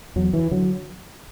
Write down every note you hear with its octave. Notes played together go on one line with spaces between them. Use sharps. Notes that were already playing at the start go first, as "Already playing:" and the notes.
E2 F#3
E3
D3 F#3